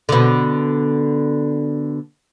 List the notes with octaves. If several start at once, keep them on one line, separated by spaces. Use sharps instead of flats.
B2 D3